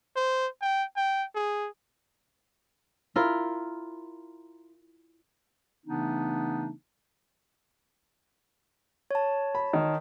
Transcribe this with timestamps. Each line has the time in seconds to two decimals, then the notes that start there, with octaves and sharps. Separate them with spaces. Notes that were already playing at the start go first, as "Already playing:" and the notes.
0.16 C5
0.62 G5
0.97 G5
1.35 G#4
3.16 E4 F4 A#4
5.86 C#3 E3 A3 B3 D4 D#4
9.11 C#5 A5
9.55 B5
9.73 D#3